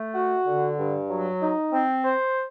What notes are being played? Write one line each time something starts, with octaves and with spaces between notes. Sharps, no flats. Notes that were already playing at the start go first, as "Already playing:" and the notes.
Already playing: A3
F#4
D3
G2
F#3
D#4
C4
C5